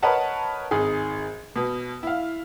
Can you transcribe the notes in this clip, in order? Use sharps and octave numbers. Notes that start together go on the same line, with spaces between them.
A#4 B4 C#5 D#5 F#5 A5
G#1 D#4 G#4
B2
E4 F5